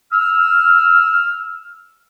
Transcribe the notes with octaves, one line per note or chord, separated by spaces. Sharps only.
E6 F6